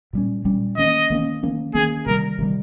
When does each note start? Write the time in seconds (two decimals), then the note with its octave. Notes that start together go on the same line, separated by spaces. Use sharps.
0.13 A#2 G3 C#4
0.45 A#2 G3 C#4
0.77 D#3 A#3 C#4 D#5
1.10 D#3 A#3 C#4
1.43 D#3 A#3 C#4
1.75 D#3 A#3 C#4 G#4
2.06 C3 D#3 G3 A#4
2.39 C3 D#3 G3